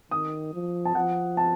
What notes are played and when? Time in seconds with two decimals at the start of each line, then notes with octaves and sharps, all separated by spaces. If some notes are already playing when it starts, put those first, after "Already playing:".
0.11 D#3 D#6
0.54 F3
0.85 A5
0.95 F3 F#5
1.37 A5